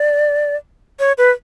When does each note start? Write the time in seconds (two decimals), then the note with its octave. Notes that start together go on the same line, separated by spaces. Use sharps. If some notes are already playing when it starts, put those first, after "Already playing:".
Already playing: D5
1.00 C#5
1.18 B4